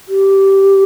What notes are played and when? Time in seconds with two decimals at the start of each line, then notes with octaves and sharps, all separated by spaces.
0.08 G4